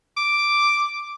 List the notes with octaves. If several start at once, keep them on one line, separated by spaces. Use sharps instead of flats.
D6